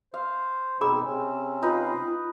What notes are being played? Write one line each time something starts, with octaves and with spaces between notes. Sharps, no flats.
C5 F5
B2 C4 D#4 G#4 B5 D6 E6
C3 C4 C#4
D#4 F4 B4